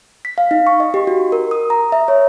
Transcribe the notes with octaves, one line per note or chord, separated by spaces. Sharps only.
B6
F5
D#4
C#6
D#5
G4
F#4
A#4
D#6
A#5
E5
C#5